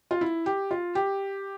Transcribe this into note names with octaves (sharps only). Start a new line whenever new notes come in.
F4
E4
G4
F4
G4